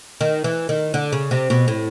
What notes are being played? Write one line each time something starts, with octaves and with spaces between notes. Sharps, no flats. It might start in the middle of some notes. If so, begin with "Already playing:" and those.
D#3
E3
D#3
D3
C#3
C3
B2
A2